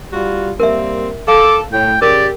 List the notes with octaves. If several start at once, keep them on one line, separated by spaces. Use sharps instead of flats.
G3 F4 F#4
G3 A#3 C4 A#4 E5
A4 F5 D6
A2 G5
C#3 G4 A#4 D5